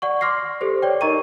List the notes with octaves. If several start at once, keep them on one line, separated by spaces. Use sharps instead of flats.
D5 F#5 C#6
C6 D6 F6 A#6 C7
G4 A4 C5
C#5 D5 G5
D#4 A#4 D#5 A#5 C#6 D#7